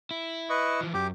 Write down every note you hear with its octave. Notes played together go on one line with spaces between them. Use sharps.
E4
B4 D#5 C#6
E3 F3
F#2 G4 D6